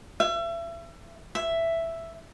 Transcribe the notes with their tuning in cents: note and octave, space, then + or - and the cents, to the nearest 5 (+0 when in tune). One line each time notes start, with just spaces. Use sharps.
E5 +35
E5 +5